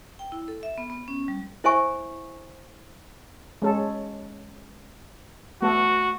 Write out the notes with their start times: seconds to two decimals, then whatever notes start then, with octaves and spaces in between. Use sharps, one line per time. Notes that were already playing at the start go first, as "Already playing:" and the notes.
0.19 G5
0.32 E4
0.48 A4
0.63 E5
0.78 B3
0.90 B3
1.08 C#4
1.28 G3
1.64 E4 C5 E5 G#5 C#6
3.62 G#3 C#4 A4
5.62 A3 B3 F#4 A4